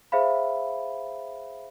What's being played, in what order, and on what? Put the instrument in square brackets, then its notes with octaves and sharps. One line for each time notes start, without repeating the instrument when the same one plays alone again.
[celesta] G#4 C5 E5 F5 B5